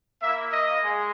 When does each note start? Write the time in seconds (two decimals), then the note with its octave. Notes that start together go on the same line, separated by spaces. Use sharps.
0.22 A#3 E5
0.27 E4
0.52 D#5
0.82 G#3